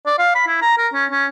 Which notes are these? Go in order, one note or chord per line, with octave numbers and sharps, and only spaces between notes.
D5
F5
B5
E4
A#5
A#4
C#4
C#4